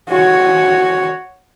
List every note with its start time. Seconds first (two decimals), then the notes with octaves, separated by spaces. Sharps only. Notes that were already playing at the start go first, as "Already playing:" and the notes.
0.10 F#4 C#5